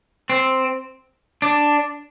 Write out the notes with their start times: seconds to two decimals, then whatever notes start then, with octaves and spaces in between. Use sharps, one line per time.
0.30 C4
1.42 D4